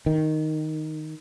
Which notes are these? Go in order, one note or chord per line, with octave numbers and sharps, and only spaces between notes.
D#3